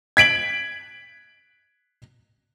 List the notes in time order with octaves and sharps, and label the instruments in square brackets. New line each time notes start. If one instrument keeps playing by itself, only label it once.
[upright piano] G#6 B6 D7 F#7